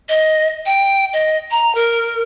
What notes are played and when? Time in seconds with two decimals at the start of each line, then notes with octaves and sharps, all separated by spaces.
0.09 D#5
0.66 G5
1.13 D#5
1.51 A#5
1.75 A#4